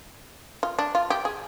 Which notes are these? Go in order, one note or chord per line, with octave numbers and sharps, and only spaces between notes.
F4
D4
F4
G4
G#4